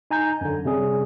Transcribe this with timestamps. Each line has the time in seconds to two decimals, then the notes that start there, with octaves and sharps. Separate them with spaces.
0.11 D#4 G#5 A#5 G6
0.41 F#2 D3
0.65 C3 G3 C#4 G#4